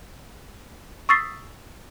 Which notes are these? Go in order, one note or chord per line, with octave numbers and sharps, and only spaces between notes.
C#6 D#6 E6 A6 B6 C7